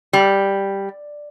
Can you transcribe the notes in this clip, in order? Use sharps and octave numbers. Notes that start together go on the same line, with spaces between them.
G3